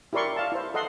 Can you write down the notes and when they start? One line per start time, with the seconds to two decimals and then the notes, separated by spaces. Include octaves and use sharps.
0.13 E4 G4 A#4 D5 C6 C#6
0.36 F5 A5
0.52 E4 C5
0.74 A4 D#5 F#5 C6